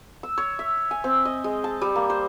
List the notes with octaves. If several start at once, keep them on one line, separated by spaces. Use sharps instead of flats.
E6
C#5
E5
G#5
C4
D#5
G#3
A5
G3
A#3
C5